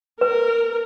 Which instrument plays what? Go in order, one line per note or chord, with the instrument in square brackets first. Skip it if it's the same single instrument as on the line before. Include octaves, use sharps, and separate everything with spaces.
[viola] A#4 [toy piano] B4